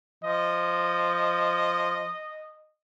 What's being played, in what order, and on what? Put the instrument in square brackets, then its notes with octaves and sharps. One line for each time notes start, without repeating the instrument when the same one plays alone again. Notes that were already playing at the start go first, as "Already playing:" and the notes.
[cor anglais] F3 [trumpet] D#5